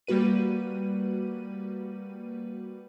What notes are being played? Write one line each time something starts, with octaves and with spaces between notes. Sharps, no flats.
G3 A#3 F#4 B4 D#7